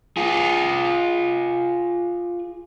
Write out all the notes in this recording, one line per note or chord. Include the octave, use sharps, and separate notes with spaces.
F4 G#4